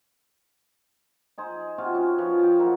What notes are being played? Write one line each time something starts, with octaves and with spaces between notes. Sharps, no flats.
D#4 G#4 C5
C3 F4 F#4 F5
C#4
F3 B4 C#5
G5 A5
D#3 F#3 E4 A#4